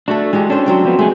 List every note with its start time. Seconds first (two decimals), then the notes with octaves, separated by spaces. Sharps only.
0.08 A3 D4 F#4 A4
0.33 E3 G#3 F#4 G4
0.50 C#4 D4 A4 C5
0.66 F#3 C4 G5
0.85 F3 B3
0.99 G#3 A3 G#4